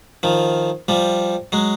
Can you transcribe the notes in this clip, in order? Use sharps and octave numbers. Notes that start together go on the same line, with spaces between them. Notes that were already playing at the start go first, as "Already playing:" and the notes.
D#3 F3
F3 G3
F#3 G#3